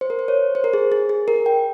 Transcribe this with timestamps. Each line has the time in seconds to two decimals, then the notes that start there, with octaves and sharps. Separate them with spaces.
0.01 C5
0.10 A#4
0.19 C5
0.28 C#5
0.55 C5
0.64 A#4
0.73 G#4
0.92 G#4
1.09 G#4
1.28 A#4
1.46 G5